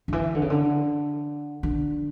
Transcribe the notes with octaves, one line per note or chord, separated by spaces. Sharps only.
D3
E3
D3
C#3
D3
D3